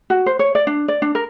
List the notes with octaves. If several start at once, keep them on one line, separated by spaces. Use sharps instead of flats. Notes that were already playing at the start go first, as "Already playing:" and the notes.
F#4
C5
C#5
D5
D4
D5
D4
A#4